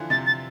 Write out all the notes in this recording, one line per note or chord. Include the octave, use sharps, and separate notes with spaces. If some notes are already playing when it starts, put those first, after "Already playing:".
Already playing: D3 E3 F3
C3 A6
A6